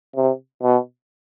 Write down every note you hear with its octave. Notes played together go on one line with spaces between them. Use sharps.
C3
B2